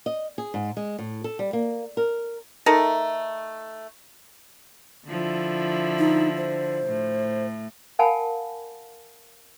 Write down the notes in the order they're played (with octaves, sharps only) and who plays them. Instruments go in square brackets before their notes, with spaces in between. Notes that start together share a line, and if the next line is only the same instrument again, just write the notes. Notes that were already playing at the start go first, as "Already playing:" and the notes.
[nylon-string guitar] D#5
G#4
G#2
G#3
A2
A4
G3
A#3
A#4
[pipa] A3 D#4 A4 A#4
[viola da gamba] D3 F3 E4
[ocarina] D#4
C5
[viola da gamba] A2
[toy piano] A#4 F5 F#5 G#5 A5 B5